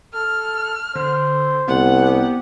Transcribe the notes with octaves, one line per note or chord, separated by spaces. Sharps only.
A4 F6
D3 C5
C2 B3 F#5
G4